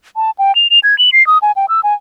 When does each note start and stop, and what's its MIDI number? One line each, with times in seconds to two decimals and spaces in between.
0.16 0.31 81
0.39 0.54 79
0.55 0.68 101
0.70 0.79 101
0.83 0.98 92
0.99 1.10 102
1.13 1.26 96
1.27 1.38 87
1.42 1.52 80
1.56 1.66 79
1.69 1.81 88
1.84 1.94 80